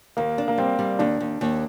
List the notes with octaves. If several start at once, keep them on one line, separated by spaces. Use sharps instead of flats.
D#2 A#3
D4
A#3
G3 C4
G3
D#2 D4
D#2
D#2